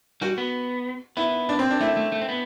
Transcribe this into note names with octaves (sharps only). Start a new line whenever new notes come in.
G3 F#4
B3
B3 E4
D4
C4
D4
A3 E4
A3
A3
C4
B3